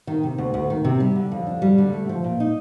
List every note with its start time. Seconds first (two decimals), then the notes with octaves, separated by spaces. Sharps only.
0.07 D#3
0.24 C3
0.38 D2
0.54 D2
0.70 D#3
0.84 C3
1.00 G3
1.16 D3
1.32 F2
1.47 D4
1.62 G3
1.78 D3
1.93 A3
2.09 F3
2.24 A#2
2.40 D#4